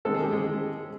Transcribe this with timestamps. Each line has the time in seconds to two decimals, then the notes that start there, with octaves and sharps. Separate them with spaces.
0.05 D#3 G#3 C4 A4
0.15 G#4
0.24 G4
0.32 G#3 G#4